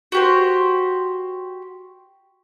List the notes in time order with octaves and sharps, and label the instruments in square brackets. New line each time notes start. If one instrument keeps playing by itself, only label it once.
[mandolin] F#4 G4 C5